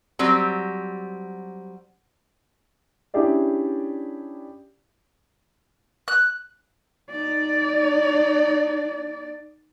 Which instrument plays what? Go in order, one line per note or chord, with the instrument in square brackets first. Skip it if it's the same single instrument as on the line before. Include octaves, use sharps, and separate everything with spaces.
[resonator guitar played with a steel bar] F#3 G3 C4
[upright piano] C#4 D4 E4 G4 G#4 D5
[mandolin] F#6
[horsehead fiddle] D#4 D5